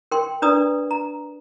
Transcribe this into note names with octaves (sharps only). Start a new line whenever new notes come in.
A#4 G5 C6
D4 B4 D5 A#5 D#6
A#5